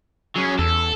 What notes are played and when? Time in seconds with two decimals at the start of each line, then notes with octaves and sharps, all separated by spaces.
0.36 F#3 C#4 G#4
0.59 E2 A4